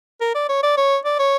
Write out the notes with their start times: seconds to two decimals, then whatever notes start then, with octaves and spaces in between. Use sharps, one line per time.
0.21 A#4
0.35 D5
0.49 C#5
0.63 D5
0.77 C#5
1.05 D5
1.19 C#5